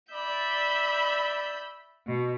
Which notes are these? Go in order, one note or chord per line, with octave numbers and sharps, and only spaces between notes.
D5 E5 B5 G6
B2